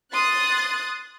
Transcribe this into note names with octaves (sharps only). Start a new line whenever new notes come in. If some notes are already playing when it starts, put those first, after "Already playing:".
C6 D#6 F#6 A6